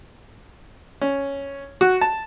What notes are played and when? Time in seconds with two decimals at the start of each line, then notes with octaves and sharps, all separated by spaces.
1.01 C#4
1.81 F#4
2.01 A5